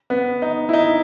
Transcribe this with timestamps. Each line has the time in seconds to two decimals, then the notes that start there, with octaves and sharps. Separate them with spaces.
0.10 B3
0.42 D#4
0.69 E4
0.73 D#4